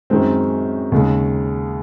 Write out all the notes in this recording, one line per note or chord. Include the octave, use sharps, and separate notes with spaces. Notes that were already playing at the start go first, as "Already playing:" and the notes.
F#2 D#3 G#3 C4
D#2 C#3 G#3